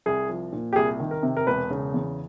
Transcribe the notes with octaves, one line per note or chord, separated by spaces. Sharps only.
C2 G#4
F3
A#2
G4
C2 G#4
D#3
A#4
C3
A#4
E1 B4
C#3
E2